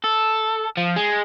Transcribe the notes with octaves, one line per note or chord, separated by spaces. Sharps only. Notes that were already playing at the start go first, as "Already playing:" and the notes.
A4
F3
G#3